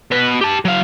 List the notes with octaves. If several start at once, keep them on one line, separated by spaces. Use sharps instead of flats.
B2 B4
G4 A5
F#3 F5